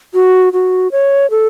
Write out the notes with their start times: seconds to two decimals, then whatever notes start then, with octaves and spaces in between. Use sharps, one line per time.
0.14 F#4
0.53 F#4
0.92 C#5
1.31 A4